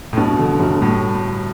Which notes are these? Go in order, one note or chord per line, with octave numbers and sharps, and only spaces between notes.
A2
G2 B2
D3
G1
A2 G3